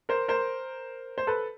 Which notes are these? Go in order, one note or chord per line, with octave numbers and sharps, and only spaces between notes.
A#4 C5
A#4 C5
C5
A4 B4